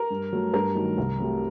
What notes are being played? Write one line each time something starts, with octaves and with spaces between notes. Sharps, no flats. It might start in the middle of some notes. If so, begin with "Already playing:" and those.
Already playing: A#4
G2
F#3 A3
G2 A#4
D#3 F#3 A3
C2
C3 F#3 A3